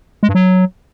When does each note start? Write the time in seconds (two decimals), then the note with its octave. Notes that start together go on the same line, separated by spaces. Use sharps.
0.23 G#3
0.29 G2
0.35 F#3